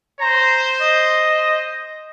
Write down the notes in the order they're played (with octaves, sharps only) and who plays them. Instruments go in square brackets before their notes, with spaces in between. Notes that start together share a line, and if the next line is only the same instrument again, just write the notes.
[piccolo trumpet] C5 [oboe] A#5
[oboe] D#5